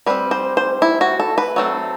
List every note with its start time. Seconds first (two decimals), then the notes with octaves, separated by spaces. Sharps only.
0.06 G3 C4 B4
0.31 C5
0.57 C5
0.82 E4
1.01 F#4
1.20 A4
1.38 B4
1.56 F#3 A3 C4